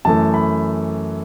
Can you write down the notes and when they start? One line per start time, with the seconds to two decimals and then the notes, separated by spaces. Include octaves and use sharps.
0.05 F#2 E3 A3 A5
0.34 B5